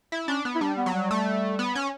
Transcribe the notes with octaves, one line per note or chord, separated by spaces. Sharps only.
E4
C#4 D4
B3
E4
G3 D4
B3
F#3
G3
A3
B3
C#4